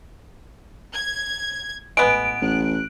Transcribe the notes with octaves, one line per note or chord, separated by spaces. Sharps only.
G#6
A1 G#3 B3 D7
A1 F#6